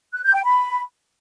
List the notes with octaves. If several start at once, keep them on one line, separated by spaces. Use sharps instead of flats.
F#6
G6
G5
B5